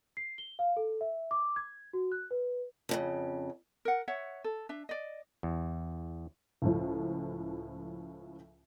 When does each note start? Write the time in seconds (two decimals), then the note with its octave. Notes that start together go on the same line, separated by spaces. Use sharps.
0.17 C7
0.38 G7
0.59 F5
0.77 A4
1.01 E5
1.31 D6
1.56 G#6
1.93 F#4
2.12 F#6
2.31 B4
2.89 F2 A2 C#3
3.85 A#4 F#5
4.08 C#5 E5 F#5
4.44 A4
4.69 D4 E5
4.89 D5 D#5
5.43 E2
6.62 C#2 A2 F3